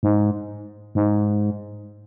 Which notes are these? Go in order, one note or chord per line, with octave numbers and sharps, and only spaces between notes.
G#2
G#2